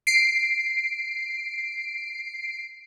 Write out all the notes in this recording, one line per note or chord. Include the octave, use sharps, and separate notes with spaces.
C7 D7